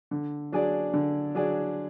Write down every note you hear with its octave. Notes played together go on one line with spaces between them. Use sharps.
D3
F#3 D4 G#4 D5
D3
F#3 D4 G#4 D5